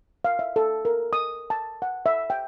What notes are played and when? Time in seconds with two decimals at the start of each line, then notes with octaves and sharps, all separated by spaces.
0.25 F5
0.39 E5
0.56 A4
0.85 A#4
1.13 D#6
1.50 A5
1.82 F#5
2.06 E5
2.30 G5